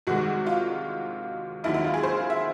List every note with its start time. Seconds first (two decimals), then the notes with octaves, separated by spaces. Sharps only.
0.07 C2 C3 D#3 G#3 F#4
0.46 F4
1.64 F1 D#2 D#3 F#3 E4
1.74 E4
1.84 F4
1.94 G#4
2.03 C5
2.17 F5
2.30 E5